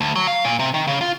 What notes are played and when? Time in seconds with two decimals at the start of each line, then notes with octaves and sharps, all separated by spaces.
0.01 D2
0.15 F#3
0.27 F5
0.45 A#2
0.59 C3
0.74 D#3
0.87 C#3
1.01 F4